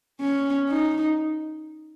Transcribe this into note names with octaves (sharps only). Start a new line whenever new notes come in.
C#4
D#4